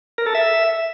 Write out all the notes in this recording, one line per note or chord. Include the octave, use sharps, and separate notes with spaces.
A#4
A4
E5